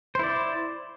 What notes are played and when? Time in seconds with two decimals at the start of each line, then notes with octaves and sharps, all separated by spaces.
0.15 C5
0.19 E4
0.23 D5